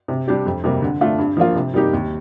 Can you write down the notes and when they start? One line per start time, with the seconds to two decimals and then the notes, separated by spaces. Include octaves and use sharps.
0.08 C3
0.28 G3 D4 G4
0.46 F2
0.64 C3 G3 A#3
0.82 D3
1.01 A3 D4 F4
1.18 G2
1.37 F3 A#3 F4
1.55 C3
1.74 G3 A#3 D#4 G4
1.93 D#2